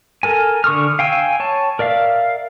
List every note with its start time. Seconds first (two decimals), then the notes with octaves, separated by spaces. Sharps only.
0.23 A4 A#4 G#5
0.64 D3 C#6 D#6 F6
0.99 F5 G5 G#5 E6
1.40 C#5 A5
1.79 A#4 D5 E5 F5